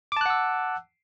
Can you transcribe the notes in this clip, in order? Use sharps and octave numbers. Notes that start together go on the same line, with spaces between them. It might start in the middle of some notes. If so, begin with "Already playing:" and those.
F#5 A5 D6 E6 F#6